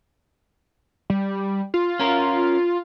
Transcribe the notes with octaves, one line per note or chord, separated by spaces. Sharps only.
G3
F4
C#4 A#4